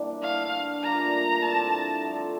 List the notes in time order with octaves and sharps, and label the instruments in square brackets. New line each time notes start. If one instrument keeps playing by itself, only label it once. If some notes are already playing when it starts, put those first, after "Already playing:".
Already playing: [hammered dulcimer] E3 G3 A#3 D4
[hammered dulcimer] G2 D3 A3 [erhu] F5
[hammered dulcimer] A#2 G3 A#3 D4 [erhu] A#5
[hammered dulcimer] G2 E3 A3 C4 [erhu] A5
[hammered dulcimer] D3 F3 A3 E4